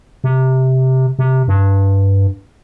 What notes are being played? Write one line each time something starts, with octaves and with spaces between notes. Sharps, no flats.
C3
C3
G2